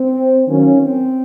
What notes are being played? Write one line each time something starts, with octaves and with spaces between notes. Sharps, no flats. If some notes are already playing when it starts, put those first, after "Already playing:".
Already playing: C4
D#3 F#3 A#3 C#4
C4